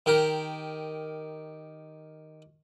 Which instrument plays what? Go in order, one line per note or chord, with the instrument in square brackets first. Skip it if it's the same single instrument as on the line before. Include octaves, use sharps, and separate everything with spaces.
[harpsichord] D#3 G4 A#4